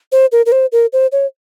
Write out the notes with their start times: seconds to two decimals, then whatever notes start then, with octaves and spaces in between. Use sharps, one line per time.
0.12 C5
0.32 A#4
0.46 A#4
0.52 C5
0.72 A#4
0.93 C5
1.12 C#5